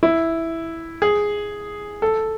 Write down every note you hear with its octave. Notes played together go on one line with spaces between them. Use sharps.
E4
G#4
A4